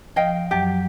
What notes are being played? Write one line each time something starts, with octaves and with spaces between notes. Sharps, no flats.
F3 D#5 F5 G5
F#2 F#3 G4